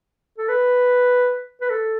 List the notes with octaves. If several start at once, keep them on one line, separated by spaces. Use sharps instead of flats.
A4
B4
B4
A4